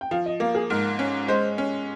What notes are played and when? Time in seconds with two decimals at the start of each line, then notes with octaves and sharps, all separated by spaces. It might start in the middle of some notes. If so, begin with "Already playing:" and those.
0.01 G5
0.11 F3 F5
0.26 D#5
0.40 A#3 F5
0.55 G#4
0.70 G#2 A#4
0.99 C#4
1.28 G#3 C5
1.58 C#4